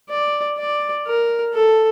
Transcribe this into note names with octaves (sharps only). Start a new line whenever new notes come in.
D5
D5
A#4
A4